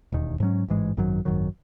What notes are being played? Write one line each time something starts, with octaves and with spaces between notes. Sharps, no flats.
E1 D#2 D#3
G#2 F#3 C#4
A1 G#2 E3 G#3
G#1 F#2 D#3 F#3
G#1 F#2 D#3 F#3